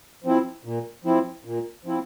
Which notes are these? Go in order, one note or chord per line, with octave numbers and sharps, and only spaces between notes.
F3 C4 E4
A#2
F3 C4 E4
A#2
F3 C4 E4